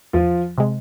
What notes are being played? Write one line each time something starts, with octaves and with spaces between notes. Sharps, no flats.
E2 F3 F4
C3 G#3